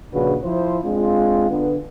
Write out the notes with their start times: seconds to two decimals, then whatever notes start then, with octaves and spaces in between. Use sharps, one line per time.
0.13 A#1 C#3 D4 F#4 B4
0.44 F3 E4 C5
0.84 G#3 C4 D4 F4
1.50 D3 B3